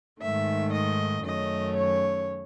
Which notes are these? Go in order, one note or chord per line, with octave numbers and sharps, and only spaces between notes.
G#2 D#3 A3 E5
D#5
F#2 D#3 A3 C#4 D#5
C#5